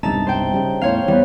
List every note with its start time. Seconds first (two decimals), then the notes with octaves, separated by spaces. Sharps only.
0.03 E1 C2 G2 D#4 E5 A5
0.27 C5 G5
0.54 C#3 G3
0.81 E2 A2 C5 C#5 F5
1.08 E2 E3 G3 B3